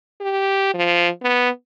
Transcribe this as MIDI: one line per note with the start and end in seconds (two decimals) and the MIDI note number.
0.21 0.72 67
0.74 1.09 53
1.23 1.49 59